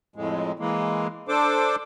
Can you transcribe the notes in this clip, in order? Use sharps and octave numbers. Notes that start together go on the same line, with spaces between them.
F2 A2 G#3
E3 G#3 A#3
D4 A4 C5 D6